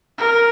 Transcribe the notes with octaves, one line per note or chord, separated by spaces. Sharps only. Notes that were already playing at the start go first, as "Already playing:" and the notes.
A#4